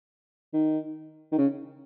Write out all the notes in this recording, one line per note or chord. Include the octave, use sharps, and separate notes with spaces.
D#3
D#3
C#3